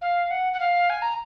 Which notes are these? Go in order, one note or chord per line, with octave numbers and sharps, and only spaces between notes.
F5
F#5
F#5
F5
G#5
A#5